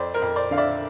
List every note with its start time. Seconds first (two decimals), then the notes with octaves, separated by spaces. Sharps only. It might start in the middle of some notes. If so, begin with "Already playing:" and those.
Already playing: F2 C5 D5
0.14 A#4 C5
0.22 F2
0.36 C5 D5
0.51 D3 F5
0.57 D5 E5